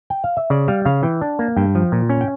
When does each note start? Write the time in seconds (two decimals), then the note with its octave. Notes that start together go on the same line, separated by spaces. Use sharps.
0.10 G5
0.24 F5
0.37 E5
0.50 C#3 D5
0.68 G3 F5
0.85 C#3 F5
1.03 E3 G5
1.21 D4
1.39 A#3
1.56 G2 G5
1.75 F3
1.92 A#2
2.09 C#4
2.21 G5